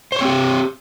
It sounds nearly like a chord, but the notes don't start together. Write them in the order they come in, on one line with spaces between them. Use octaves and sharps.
C5 C#5 C4 G4